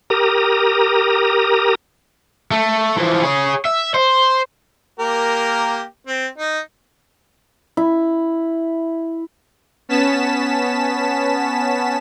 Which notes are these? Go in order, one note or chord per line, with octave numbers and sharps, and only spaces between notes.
G4 A#4 A#5 D#6
A3
E3 F3
G#4 C#5
E5
C5
A#3 G4 A#4
C4
D#4
E4
B3 C#4 A5 B6 E7